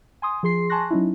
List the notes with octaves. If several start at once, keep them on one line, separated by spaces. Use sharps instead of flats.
G#5 C6 D#6
F3 G#4 C6 C7
G#5 A5 C6 C#6 F#6 A#6
F#3 C#4 D#4 E4